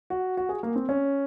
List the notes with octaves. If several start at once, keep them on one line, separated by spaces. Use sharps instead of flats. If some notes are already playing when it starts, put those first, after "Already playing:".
F#4
F#4
G#4
A#3
C4
C#4